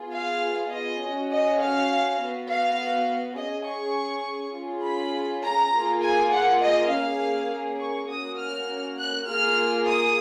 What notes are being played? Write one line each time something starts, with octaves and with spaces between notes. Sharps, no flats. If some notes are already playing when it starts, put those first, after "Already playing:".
Already playing: B3 F4 G#4
F5
D#5
C#4 F#4
D#5
F5
B3 F#4
F5
C#4 G#4 D#5
C#6
C#4 F4 G#4
B5
A#5
A#3 F4 G#4
G#5
F#5
D#5
A#3 C#4 G#4 F5
C#6
A#3 C#4 F#4 D#6
F6
F#6
A#3 F4 G#4 F6
D#6